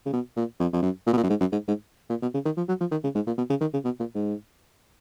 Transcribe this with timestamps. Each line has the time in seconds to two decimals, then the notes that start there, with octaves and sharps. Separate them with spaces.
0.06 C#3
0.13 B2
0.37 A#2
0.60 F2
0.73 F2
0.82 F#2
1.07 A#2
1.13 B2
1.18 A#2
1.24 F#2
1.30 G#2
1.41 F#2
1.53 G#2
1.68 G#2
2.10 A#2
2.22 B2
2.34 C#3
2.45 D#3
2.57 F3
2.69 F#3
2.81 F3
2.91 D#3
3.04 C#3
3.15 G#2
3.27 A#2
3.38 B2
3.50 C#3
3.61 D#3
3.73 C#3
3.85 B2
4.00 A#2
4.15 G#2